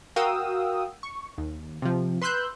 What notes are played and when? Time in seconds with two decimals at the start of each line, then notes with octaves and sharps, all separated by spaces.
0.16 F#4 A#4 F5 G5 D#6 E6
1.03 C#6
1.38 D#2
1.82 C3 F3
2.22 B4 C6 E6 F#6 G6